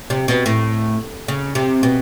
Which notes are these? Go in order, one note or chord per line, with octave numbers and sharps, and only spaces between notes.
C3
B2
A2
C#3
C3
B2